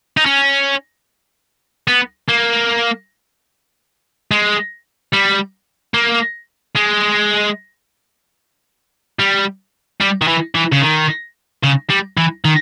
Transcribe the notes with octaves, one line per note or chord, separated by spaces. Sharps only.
D#4
C#4
B3
A#3
G#3
G3
A#3
G#3
G3
G3
D#3
E3
E3
C#3
D#3
C#3
G3
E3
D#3